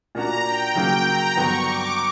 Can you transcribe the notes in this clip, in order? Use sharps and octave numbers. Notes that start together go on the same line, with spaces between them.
A#2 A#3 D4 F#4 A#5
G5
C#3 F#3 A#3 G5
A#5
G2 D3 F#3 B3 C#6
D6